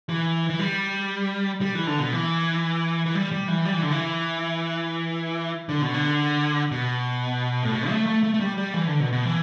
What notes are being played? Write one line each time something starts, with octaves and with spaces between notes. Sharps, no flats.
E3
E3
G3
G3
E3
D3
B2
E3
E3
G3
G3
E3
G3
E3
D3
E3
D3
B2
D3
B2
A2
B2
A3
A3
A3
A3
G3
G3
E3
D3
B2
B2
E3